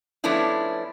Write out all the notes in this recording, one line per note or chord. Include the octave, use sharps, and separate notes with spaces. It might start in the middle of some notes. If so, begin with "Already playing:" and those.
F3 A3 B3 C#4 D4 E4